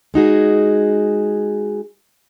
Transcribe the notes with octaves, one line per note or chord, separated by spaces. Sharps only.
G#3 D#4 F#4 G#4